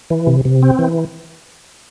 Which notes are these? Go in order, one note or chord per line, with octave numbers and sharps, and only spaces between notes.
E3
C3
C3
C4
E3